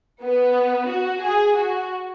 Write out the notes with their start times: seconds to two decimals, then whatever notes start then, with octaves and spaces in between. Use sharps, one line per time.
0.22 B3
0.88 F#4
1.22 G#4
1.56 F#4